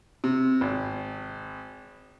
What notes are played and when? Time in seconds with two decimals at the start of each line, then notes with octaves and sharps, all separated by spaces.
0.24 C3
0.61 G#1